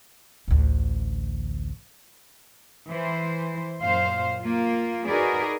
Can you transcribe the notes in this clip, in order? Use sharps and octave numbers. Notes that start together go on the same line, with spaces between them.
A1 D2
E3 C5
F#2 A#2 C5 F5
A#3 F4
D#4 F#4 G#4 A#4 B4 D5